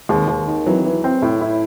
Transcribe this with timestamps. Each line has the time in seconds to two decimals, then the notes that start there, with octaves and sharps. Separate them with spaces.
0.09 D#2 G#3
0.28 D#2
0.47 D#3
0.66 E3 F#3
0.85 E3
1.04 C4
1.22 A2
1.41 E4